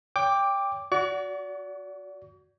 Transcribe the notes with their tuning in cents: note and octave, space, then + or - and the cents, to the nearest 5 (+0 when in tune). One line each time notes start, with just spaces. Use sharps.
C#5 +40 G5 +15 D6 +0
F#4 +0 D5 -30 C#6 +40